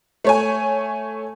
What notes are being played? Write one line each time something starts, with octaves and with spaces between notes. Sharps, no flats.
A3 C#5 G#5